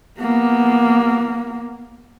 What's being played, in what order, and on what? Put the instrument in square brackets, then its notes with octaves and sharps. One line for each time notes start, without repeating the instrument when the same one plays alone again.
[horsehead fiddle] A#3 B3